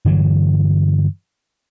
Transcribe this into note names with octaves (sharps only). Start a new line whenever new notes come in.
G2 D3 E3 F#3